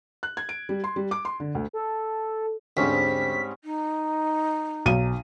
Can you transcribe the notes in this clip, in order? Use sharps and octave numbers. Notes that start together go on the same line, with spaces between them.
F#6
G#6
D7
G3
C6
G3
D6
C6
D3
D2
A4
D2 G#2 G3 C4 C#4 C5 B6
D#4
B1 D#7